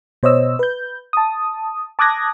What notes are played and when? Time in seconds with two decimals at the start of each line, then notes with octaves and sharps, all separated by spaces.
0.23 B2 C5 C#5 D#5 E6
0.59 B4 G6
1.13 A5 D#6
1.99 A5 D6 D#6 F#6 G#6 A#6